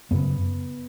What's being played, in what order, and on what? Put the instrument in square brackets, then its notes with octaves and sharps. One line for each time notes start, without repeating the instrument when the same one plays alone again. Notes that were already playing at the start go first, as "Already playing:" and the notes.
[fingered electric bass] F#2 C#3 B3